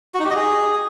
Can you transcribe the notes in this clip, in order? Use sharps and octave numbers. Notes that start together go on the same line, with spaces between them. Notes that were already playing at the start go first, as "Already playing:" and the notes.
F#4
D#4
G4
D#5
G#4